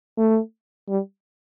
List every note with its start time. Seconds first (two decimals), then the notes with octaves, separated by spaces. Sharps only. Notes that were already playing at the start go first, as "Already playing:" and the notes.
0.18 A3
0.89 G3